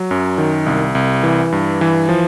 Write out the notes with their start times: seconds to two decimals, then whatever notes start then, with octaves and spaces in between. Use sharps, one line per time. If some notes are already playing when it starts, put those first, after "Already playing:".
Already playing: F#3
0.11 F#2
0.38 D#3
0.66 C2
0.95 C2
1.23 E3
1.52 G2
1.81 E3
2.09 F3